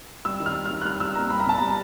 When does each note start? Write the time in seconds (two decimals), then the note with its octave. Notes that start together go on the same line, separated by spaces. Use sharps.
0.25 G3 E6
0.40 D#3
0.46 F6
0.55 G3
0.65 F6
0.71 D#3
0.81 F#6
0.85 G3 F6
1.00 G3 E6
1.15 A#3 A#5
1.30 G3 B5
1.40 A#5
1.46 B2 A5
1.58 G3 A#5